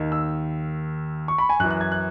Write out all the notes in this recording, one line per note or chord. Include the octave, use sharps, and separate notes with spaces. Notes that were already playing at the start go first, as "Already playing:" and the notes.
Already playing: D#2 D#3
E6
C#6
B5
G#5
F#2 E3 F#6
F#6
G#6
F#6